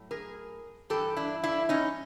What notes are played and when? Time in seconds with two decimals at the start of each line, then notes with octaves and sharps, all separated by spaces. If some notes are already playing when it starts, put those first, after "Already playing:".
Already playing: A2 F#3
0.11 G#4 A#4
0.90 G2 E3 G4 A4
1.16 D4 E4
1.43 D4 E4
1.69 C#4 D#4